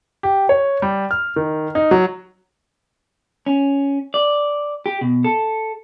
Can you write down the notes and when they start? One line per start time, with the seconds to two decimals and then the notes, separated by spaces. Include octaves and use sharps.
0.23 G4
0.49 C#5
0.82 G3
1.11 F6
1.36 D#3
1.75 D#4
1.91 F#3
3.46 C#4
4.14 D5
4.86 G4
5.01 B2
5.24 A4